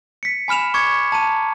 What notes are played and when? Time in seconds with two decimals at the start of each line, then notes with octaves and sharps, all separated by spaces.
0.23 B6 C#7
0.48 G#5 B5 F6 E7 F7
0.74 C#6 D6 G#6 C#7
1.12 A5 A#5 D#7